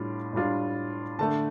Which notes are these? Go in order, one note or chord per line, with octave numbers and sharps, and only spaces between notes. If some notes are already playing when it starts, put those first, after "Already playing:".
Already playing: A2 G3 D4 F4
A2 G3 D4 F4
D3 A3 D4 A5